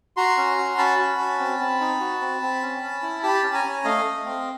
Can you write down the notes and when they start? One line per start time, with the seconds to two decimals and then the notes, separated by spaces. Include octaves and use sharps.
0.17 F#4 A#5 C6
0.37 C#4
0.58 F#4
0.78 C#4 A5 B5
0.99 F#4
1.19 C#4
1.39 C4
1.60 C4
1.80 D#4
2.00 F#4
2.21 C4
2.42 C4
2.62 C#4
2.83 C#4
3.02 E4
3.23 G4 A5 B5
3.43 C#4
3.54 G#5 A#5
3.64 C#4
3.84 A3 D#5 F5
4.05 A3
4.25 C4